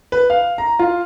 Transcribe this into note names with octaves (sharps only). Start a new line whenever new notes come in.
B4
F5
A#5
F4